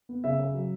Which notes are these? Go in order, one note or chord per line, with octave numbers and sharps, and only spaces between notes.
B3
C#3 E5
C#3
F#3